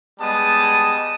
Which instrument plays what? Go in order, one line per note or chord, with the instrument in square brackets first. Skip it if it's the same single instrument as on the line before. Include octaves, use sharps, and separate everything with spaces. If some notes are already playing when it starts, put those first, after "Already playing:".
[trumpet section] G3 G#3 B3 A5 D#6